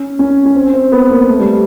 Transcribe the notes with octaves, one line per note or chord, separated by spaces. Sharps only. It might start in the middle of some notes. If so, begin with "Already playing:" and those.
Already playing: C#4
C#4
C#4
C4
C4
B3
A#3
A3
G3